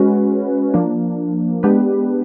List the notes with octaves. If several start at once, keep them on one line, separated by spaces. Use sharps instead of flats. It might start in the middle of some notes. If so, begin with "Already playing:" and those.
Already playing: G#3 C#4 F#4 B4
F3 A#3 D4
G#3 B3 D4 G4 B4